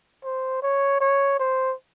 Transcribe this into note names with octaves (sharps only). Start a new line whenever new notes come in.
C5
C#5
C#5
C5